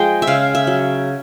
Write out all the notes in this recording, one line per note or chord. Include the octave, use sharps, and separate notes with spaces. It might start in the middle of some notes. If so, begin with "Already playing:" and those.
Already playing: F3 G#3 G5
E5
C#3 F5
E5
F#3